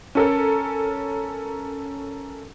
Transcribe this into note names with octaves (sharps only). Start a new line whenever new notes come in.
C#4 A4 A#4